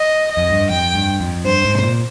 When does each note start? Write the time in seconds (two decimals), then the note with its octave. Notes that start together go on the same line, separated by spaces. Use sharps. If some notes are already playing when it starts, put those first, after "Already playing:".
Already playing: D#5
0.31 D#5
0.37 F2
0.50 G2
0.70 F2 G5
0.94 G2
1.20 F2
1.45 G2 C5
1.65 G#2
1.75 C3
1.83 A#2